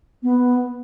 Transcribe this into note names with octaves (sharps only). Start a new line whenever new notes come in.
B3